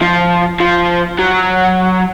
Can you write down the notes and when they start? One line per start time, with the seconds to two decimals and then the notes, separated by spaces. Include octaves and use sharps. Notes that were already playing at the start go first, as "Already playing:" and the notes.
0.02 F3
0.60 F3
1.19 F#3